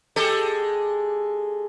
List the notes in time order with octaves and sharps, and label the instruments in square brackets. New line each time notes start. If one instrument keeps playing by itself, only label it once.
[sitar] G#3 G4 A4